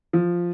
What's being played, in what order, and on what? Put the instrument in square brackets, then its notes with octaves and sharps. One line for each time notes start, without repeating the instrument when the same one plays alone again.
[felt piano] F3